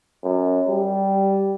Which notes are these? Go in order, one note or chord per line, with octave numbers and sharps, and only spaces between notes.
F#2
G3